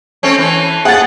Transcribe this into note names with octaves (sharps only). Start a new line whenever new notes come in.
A3 C4 C#4
E3
G#4 F#5 A6